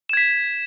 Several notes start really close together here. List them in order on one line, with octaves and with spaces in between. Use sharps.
E7 G#6 B6